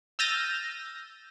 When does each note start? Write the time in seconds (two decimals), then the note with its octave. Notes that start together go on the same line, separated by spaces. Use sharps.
0.19 E6 F6 G6 A6 A#6 D#7